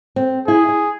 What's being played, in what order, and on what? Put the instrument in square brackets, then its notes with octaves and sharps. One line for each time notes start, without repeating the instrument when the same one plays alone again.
[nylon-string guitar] C4
[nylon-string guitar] E4 [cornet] G#4
[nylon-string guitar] E4